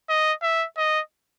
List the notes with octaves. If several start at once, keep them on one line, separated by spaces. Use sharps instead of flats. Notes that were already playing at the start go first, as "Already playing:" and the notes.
D#5
E5
D#5